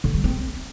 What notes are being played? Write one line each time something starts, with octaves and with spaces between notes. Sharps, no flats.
D3
G3
C4